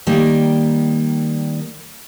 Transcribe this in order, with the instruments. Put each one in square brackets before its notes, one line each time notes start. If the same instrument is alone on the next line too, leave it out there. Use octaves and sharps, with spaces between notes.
[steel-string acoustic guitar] D#3 G3 A#3